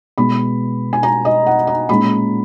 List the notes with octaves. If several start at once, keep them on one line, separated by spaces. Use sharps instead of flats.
B2 G#3 B3 B5
G#5
A#5
D#5
F#5
A#5
A#2 G#3 C#4 B5